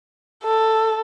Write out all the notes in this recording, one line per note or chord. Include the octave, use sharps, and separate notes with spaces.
A4